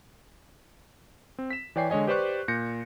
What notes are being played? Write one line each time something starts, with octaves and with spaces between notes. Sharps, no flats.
C4
B6 E7
E3 C#5 D5 G5 G#5 C7
D3 G#3 C#5 D#5 G#5
G4 B4 C5 D5 C#6 F#6
A#2 G6 A#6 C#7